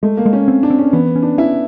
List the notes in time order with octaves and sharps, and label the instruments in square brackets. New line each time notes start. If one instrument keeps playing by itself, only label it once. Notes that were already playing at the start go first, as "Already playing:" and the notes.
[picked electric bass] G#3 [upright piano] A3
[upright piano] A#3
[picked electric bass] G#3
[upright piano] C#4
[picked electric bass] C4
[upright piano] D4
[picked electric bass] C4
[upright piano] C#4
[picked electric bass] E3 [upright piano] B3
[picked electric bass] C#4
[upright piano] D4
[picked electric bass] C#4 [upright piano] E4